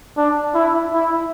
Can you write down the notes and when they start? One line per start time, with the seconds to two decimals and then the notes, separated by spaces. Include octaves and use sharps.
0.17 D4
0.54 E4
0.93 E4